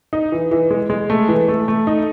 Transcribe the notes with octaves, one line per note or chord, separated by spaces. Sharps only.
D#4
E3
E3
G#3
G#3
A3
E3
A3
A3
D#4